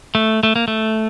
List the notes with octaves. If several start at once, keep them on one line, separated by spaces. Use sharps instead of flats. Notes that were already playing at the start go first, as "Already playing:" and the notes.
A3
A3
A#3
A3